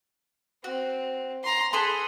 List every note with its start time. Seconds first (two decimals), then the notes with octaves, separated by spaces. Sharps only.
0.64 C4 F#4
1.44 A#5 C6
1.73 G#4 A4 B4 C6